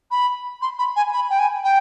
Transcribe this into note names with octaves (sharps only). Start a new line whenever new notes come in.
B5
C6
B5
G#5
B5
G5
G#5
G5